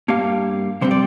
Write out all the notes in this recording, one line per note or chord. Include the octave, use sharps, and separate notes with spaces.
G2 G3 A#3 F5
C3 G3 C4 C5
D5